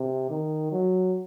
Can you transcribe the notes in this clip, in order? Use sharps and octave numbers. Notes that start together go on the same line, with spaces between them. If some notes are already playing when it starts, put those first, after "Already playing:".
Already playing: C3
D#3
F#3